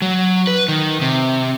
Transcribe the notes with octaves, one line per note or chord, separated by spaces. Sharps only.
F#3
B4
D#3
C3